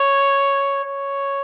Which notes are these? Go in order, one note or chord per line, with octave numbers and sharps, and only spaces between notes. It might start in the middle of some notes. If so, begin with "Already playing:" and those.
Already playing: C#5
C#5